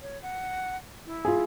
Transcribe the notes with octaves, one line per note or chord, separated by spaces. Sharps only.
C#5
F#5
E4
F4 G#4